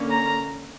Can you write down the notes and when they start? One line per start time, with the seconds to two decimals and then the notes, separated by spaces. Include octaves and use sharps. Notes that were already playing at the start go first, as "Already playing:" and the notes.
Already playing: D3 A#3 C#4
0.10 A#5